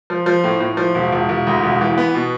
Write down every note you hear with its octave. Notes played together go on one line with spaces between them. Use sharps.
F3
F3
A2
A2
F3
E1
E1
E1
D2
E1
E3
B3
B2